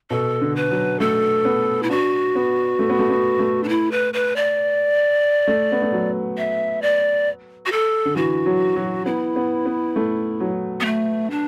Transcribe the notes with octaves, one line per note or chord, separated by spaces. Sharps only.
B2 A4
D3
B4
F#3
A3 A4
B3
E4
D4 F#4
B3
A3
B3
A3
B3
A3
D4
E4
B4
B4
D5
A3
B3
A3
F#3
E5
D5
F#4
A4
D3
E3 F#4
F#3
F#3
B3 E4
B3
B3
A3
F#3
B3
A3
D4